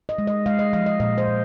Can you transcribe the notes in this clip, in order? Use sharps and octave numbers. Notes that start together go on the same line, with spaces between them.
D#5
G#3
D#5
G#3 F5
D#5
F3 F5
D#5
A#2 D#5
C5
A#2